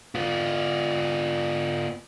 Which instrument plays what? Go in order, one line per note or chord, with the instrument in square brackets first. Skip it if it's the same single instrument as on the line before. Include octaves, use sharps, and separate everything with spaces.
[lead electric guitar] B3 F4